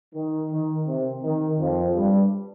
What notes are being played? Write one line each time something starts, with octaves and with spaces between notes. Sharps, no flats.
D#3
D#3
C3
D#3
F2 F3
G2 G3